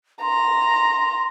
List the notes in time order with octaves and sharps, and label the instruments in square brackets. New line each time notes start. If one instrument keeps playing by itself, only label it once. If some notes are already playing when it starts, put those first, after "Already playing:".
[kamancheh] A#5 [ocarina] C6